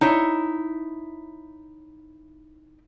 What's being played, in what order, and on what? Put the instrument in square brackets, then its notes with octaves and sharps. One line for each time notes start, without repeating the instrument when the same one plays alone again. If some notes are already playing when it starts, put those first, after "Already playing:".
[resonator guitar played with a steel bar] D#4 E4 C#5